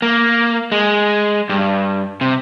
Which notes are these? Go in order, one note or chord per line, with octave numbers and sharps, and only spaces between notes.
A#3
G#3
G2
C3